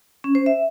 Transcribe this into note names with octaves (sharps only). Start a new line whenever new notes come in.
C#4
C5
E5